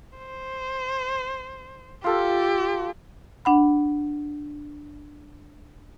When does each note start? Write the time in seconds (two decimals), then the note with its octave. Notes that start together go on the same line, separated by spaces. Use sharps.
0.18 C5
2.04 F4 G4 A4
3.45 D4 F#5 B5